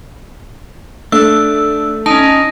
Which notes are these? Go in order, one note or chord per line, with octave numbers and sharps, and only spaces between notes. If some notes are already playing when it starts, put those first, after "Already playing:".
A3 D4 E6
C#4 D#4 D#5 A5